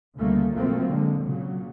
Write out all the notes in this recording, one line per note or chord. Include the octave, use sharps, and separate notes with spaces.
D2 C#3 G3 A3 A#3
B1 F3 F#3 A3 A#3 C4
D3 G#3
A#2 C#3 F#3